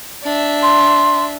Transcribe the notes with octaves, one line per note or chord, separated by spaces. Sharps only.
D4 E5
C6